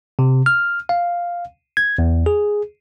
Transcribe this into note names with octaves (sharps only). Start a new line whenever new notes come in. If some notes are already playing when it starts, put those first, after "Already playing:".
C3
F6
F5
G#6
E2
G#4